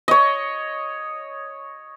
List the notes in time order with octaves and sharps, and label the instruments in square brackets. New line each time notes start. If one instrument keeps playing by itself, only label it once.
[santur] C#5 D#5